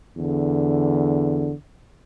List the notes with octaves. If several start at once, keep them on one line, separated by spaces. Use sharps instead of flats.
E2 D3